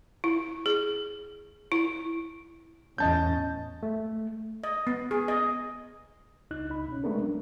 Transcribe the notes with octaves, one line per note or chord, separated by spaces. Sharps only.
E4
G#4
E4
E2 A2 C#4 D#5 A5 G6
A3
D#5
B3
G#4
D#5
C#2 D#4 F#6
C#2 D#4 B5
B2 C#4
G#3 A3 B3 D4 A#4
F#3